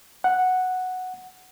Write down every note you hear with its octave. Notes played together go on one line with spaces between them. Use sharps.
F#5